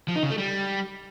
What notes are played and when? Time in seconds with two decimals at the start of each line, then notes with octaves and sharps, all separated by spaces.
0.08 F3
0.16 D#4
0.23 C#3
0.31 A3
0.38 G3